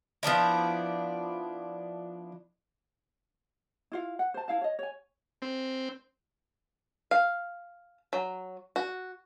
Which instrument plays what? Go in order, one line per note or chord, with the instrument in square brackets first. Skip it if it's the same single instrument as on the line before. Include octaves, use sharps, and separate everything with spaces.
[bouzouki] F3 B3 D4 E4
[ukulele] E4 F4 F5
F#5
C5 A5
E4 F5 A5
C#5 D#5
C#5 G#5
[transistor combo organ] C4
[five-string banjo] F5
F#3
F#4